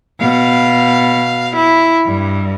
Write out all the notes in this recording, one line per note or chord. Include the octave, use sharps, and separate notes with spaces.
B2 F5
E4
G2